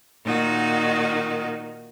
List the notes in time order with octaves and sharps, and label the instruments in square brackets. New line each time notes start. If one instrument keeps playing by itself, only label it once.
[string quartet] A#2 D#3 D#4 F#4